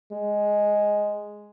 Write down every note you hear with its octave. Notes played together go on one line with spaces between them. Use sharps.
G#3